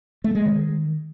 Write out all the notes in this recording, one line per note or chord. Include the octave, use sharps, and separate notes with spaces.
A3
G#3
D#3